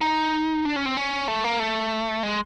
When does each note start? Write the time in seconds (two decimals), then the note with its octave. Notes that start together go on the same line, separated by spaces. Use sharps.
0.01 D#4
0.65 D4
0.76 C#4
0.86 C4
0.97 C#4
1.28 A3
1.44 A#3
1.59 A3
2.23 G#3